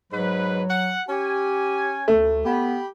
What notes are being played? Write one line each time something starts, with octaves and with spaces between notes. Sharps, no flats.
G#2 F#3 B4
F#5
C#4 G4 G#5
D2 A3
B3 G4 B5